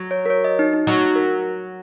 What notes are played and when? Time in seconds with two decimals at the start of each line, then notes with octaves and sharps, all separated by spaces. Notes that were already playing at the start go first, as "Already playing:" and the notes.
Already playing: F#3
0.11 C#5
0.26 A#4
0.30 C#5
0.44 D#5
0.59 D#4
0.74 D#4
0.87 F#3 D#4
1.15 A#4